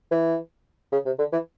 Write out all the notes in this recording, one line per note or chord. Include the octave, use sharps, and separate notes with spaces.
E3
C#3
C3
D3
E3